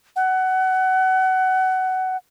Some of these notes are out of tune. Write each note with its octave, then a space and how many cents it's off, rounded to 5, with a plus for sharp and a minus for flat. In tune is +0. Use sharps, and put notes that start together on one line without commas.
F#5 +25